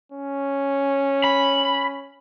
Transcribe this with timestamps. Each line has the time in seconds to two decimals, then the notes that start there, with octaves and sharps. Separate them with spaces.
0.12 C#4
1.24 B5